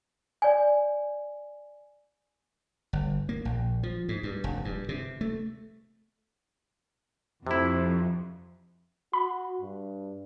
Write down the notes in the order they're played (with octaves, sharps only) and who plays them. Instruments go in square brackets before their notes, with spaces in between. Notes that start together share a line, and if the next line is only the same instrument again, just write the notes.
[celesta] D5 G#5
[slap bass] G1
A#3
A#1
F3
G#2
G2
F1
G2
C3
A3
[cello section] F2 [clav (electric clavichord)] C3 E4
[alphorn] F#4 [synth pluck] B5
[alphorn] G2